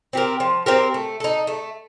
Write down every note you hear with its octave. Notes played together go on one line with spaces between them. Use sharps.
C4 G4 A#4
F3
C4 G4 A#4
A3
D#4 A4
A3